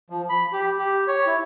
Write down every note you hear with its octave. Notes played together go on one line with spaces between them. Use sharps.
F3
B5
G4
G4
C#5
E4